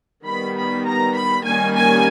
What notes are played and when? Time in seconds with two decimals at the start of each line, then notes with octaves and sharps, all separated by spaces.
0.24 D#3 G3 B3 B5
0.54 B5
0.84 A#5
1.14 B5
1.44 D#3 G3 A#3 C#4 G#5
1.74 G#5